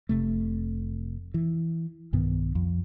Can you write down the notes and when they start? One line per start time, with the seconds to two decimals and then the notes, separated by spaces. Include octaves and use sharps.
0.09 F1 C3 A3
1.34 E3
2.13 B1 G2 D#3 B3
2.55 F2